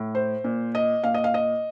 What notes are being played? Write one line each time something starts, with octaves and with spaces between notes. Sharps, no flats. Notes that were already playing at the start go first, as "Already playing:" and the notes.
Already playing: A2
C5
A#2
D#5
A#2 F5
D#5
F5
D#5